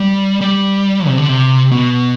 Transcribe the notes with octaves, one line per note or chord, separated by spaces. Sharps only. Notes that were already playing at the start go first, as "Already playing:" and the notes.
Already playing: G3
G3
C3
D3
C3
B2